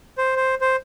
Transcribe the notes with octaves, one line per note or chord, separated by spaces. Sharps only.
C5
C5
C5